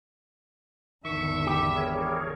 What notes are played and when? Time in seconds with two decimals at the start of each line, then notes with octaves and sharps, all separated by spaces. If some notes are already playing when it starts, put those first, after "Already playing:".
1.05 G#1 E2 D3 D#3 E5 C#6
1.47 E4 G4
1.76 G#4 A#4 C#5